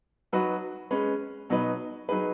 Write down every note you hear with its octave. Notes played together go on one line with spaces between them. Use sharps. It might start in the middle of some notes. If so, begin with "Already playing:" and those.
F#3 D#4 F#4 B4
G#3 C#4 B4
B2 F#3 D#4 B4
F#3 D#4 G#4 B4